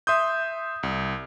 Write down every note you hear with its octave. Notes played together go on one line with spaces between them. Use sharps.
E5 C6 D#6 G6
C2